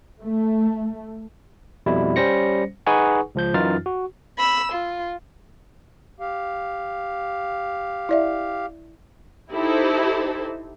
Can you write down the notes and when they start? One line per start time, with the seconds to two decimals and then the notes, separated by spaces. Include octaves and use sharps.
0.22 A3
1.86 F2 B2 G3 E4
2.16 G3 C#4 C5 A#6 C#7
2.86 D#4 G#4 B4 F#5 G#5 C#6
3.35 C#2 F3 G6
3.54 F#2 E3 D#4 F4 F6 A6
3.86 F#4
4.38 B5 E6
4.73 F4
6.20 G4 F5
8.09 E4 D5 E5
9.51 D#4 E4 G4 A4 C5